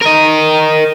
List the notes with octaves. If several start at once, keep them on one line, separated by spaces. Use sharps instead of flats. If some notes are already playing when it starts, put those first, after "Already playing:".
A#4 D#5